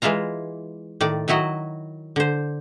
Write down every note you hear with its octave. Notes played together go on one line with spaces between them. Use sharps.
E3 G#3 E4 F4 A#5
A2 D#3 D5
D#3 F#3 E4 F#4 D#5
D3 C5